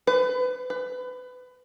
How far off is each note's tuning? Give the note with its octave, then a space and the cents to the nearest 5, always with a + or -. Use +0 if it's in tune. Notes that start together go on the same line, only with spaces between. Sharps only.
B4 +30
B4 +25